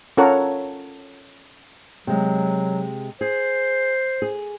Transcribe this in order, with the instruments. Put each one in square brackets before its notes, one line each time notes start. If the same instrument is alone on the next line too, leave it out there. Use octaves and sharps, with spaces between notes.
[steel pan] C#4 F4 A4 A#4 C#5 F#5
[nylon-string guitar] C3 G#3 [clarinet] F#3
[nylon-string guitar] G#4 [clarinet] C5
[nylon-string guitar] G#4